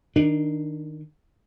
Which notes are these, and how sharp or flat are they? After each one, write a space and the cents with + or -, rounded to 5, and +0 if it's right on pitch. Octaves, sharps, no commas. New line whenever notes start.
D#3 +0 D4 +15